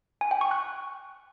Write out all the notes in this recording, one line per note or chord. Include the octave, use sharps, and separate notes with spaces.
G#5
G5
C#6
F#6